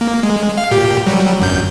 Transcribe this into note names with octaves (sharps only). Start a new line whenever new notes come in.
A#3
G#3
F5
A#2 G4
F#3 G3
G1 F#2 G6